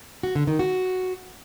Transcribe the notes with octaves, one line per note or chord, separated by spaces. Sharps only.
F#4
D3
D#3
F#4